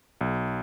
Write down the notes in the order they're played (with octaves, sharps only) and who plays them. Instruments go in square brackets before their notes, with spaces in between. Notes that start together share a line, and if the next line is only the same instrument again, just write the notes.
[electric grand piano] B1